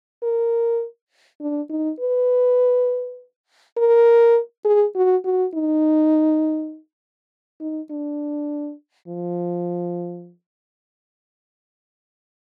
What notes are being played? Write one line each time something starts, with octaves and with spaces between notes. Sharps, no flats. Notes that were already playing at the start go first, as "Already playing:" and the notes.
A#4
D4
D#4
B4
A#4
G#4
F#4
F#4
D#4
D#4
D4
F3